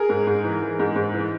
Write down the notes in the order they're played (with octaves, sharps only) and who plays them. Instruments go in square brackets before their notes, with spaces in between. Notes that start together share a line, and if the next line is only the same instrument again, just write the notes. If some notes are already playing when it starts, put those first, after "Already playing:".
Already playing: [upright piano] G#4 A#4
G#2
G#2
E3
E3
G#2
G#2
E3